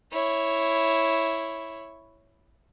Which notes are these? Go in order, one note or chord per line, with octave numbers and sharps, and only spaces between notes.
E4 C#5